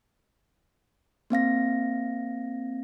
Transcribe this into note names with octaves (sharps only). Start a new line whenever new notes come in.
A#3 C4 F5 A#6